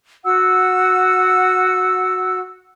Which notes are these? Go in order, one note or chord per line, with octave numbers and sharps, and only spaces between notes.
F#4 F#5 E6